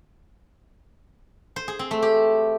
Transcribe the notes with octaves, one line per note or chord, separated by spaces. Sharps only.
C5
G#4
C4
A3
G4